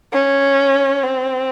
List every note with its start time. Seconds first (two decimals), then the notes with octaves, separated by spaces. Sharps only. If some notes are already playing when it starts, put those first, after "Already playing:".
0.13 C#4
1.03 C4